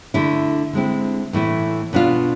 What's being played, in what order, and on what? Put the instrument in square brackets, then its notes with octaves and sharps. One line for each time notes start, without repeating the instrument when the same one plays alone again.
[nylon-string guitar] D3 A3 E4
D3 G#3 C4 E4
A2 E3 A3 E4
B2 B3 D4 F4